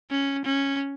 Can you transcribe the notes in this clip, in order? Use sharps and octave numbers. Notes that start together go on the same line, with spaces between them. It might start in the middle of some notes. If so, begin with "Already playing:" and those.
C#4
C#4